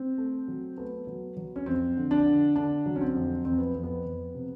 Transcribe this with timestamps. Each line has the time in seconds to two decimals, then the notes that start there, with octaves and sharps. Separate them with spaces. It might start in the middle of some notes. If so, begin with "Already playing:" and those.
Already playing: C4
0.18 A3
0.48 F#3
0.77 A3 B3
1.07 F#3
1.37 F#3
1.56 C#4
1.66 F2 C4
1.96 D3
2.11 D4
2.26 D3
2.56 D3 D4
2.86 F#3
2.96 C#4
3.01 C4
3.15 F2
3.45 F2 C4
3.58 B3
3.75 F2
3.83 B3
4.05 F2
4.35 C3